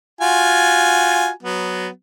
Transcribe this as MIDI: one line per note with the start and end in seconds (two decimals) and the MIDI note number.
0.21 1.29 65
0.21 1.29 66
0.21 1.29 80
1.43 1.88 54
1.43 1.88 59